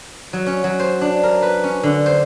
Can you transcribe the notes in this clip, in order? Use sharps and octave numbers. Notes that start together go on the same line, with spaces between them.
F#3
C#4
F#3
C5
D4
A#4
B4
C#4
D3
C5